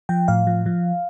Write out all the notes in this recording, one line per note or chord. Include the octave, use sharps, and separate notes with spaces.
F3 G5
A2 F5
F3
F3